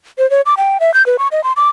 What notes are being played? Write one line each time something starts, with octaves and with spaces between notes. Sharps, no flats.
C5
C#5
D6
G5
E5
G6
B4
C#6
D#5
C6
D6